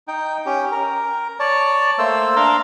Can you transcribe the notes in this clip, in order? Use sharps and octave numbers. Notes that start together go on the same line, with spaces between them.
D#4 G5
C#4 G4
A#4
C#5 D5 A5
A3 A#3 C5 E6
D4 A#4 F5 A#5 C6